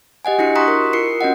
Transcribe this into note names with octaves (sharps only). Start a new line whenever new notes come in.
G4 D#5 F#5 G#5
D4 E4 F#4 C#7
A#5 C6 C#6 D#6 F#6 B6
A#4
F4 A#4 C7 C#7
C#4 F#4 D#5 F#5